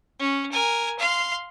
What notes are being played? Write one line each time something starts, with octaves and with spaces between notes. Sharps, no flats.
C#4
A#4 G#5
F5 C6